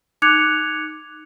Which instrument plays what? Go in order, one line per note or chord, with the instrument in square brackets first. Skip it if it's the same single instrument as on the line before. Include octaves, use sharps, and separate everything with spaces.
[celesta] D#4 D6 F#6 G#6 C#7 F7